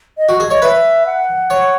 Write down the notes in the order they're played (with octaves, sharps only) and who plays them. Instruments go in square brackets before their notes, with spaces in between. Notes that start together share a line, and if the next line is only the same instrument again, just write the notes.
[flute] D#5
[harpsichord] F#4
G#4
[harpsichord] C#5 [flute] D#5
[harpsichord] B4 [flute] E5
[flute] F#5
[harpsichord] C#5